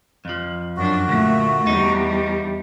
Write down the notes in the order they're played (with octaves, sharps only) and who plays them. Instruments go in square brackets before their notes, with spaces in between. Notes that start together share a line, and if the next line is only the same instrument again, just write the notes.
[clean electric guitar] F2 F3
[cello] F#2 D4 [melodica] F#4
[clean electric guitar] D2 [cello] A#2 A3
[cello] E2 G3 [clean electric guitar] D#4